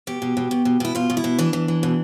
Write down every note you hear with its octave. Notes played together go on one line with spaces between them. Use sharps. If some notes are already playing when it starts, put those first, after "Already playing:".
B2 G4
B2
B2
B2
B2
B2 E4
B2 F4
B2
E4
B2
E3 D4
E3
E3
B2